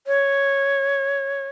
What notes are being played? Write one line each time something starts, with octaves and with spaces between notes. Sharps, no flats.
C#5